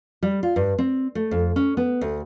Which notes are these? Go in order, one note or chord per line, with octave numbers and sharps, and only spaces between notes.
G3
F4
G2
C4
A3
F2
C#4
B3
D2